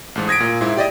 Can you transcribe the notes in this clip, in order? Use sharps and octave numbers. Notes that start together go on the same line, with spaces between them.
A1 G#2
D#6 G#6 A#6 B6 D7
A#2
G#2 E4
G4 D5 D#5